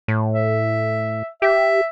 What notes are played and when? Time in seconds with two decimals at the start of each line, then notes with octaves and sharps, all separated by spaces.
0.08 A2
0.34 E5
1.42 G4 E5